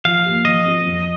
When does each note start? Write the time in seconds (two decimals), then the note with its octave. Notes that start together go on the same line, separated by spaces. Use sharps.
0.05 F3 F5
0.25 A#3 G4
0.45 F3 D#5
0.65 C4 F4
0.86 F2